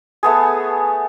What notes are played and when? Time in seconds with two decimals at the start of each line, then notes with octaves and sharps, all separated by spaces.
0.23 A3 B3 G#4